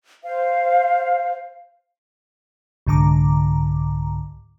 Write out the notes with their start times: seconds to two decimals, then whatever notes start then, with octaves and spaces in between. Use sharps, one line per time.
0.24 C5 F5
2.87 C2 G#2 D3 A#5 D6